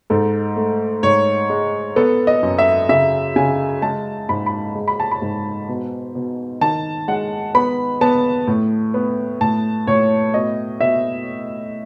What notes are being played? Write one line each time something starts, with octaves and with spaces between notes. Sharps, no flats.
G#2 A4
A3
G#2 C#5
G#3
B3 A4
D#5
F#2
E5
C#3 E5
C#3 G#5
G#3 A5
G#2 B5
B5
G#3
B5
A5
B5
G#2
B2
B2
D#3 A5
G#3 F#5
B3 B5
B3 A5
A2
B3
A2 A5
A2 C#5
B2 D#5
B2 E5